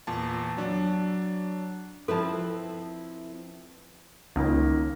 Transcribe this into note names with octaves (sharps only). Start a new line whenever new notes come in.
E2 A#2 A5
F#3 D4
F3 C4 E4 A4 B4 A5
C#2 D#3 A#3